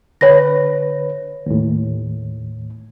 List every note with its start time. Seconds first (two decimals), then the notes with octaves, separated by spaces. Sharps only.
0.21 D3 B4 C#5 A#6
1.46 D#2 A2